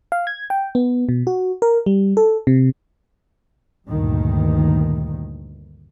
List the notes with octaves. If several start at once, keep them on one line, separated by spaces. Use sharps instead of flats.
F5
G#6
G5
B3
B2
F#4
A#4
G3
A4
C3
D2 G2 A#2 D#3